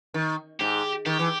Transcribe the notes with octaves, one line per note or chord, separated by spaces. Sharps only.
D#3
G#2 G4
D#3 G4
E3